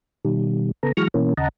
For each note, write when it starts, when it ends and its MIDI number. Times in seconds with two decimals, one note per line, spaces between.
0.25 0.71 47
0.25 0.71 51
0.25 0.71 55
0.83 0.92 49
0.83 0.92 59
0.83 0.92 69
0.83 0.92 82
0.97 1.08 52
0.97 1.08 54
0.97 1.08 56
0.97 1.08 85
0.97 1.08 89
0.97 1.08 94
1.14 1.34 47
1.14 1.34 52
1.14 1.34 58
1.14 1.34 61
1.37 1.49 39
1.37 1.49 49
1.37 1.49 75
1.37 1.49 78
1.37 1.49 81
1.37 1.49 82